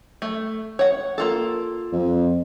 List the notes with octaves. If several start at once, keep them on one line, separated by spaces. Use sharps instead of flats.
A3
C#5 F#5
A#3 F4 A4
F2